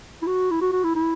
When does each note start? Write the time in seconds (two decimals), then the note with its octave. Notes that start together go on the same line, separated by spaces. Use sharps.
0.22 E4
0.27 F#4
0.51 E4
0.61 F#4
0.72 F#4
0.84 E4
0.96 E4